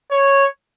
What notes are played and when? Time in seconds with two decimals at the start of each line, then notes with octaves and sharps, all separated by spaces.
0.11 C#5